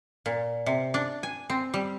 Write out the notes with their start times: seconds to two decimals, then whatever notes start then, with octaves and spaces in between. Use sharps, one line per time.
0.26 A#2
0.66 C3
0.94 D4
1.23 G#5
1.50 C4
1.74 G3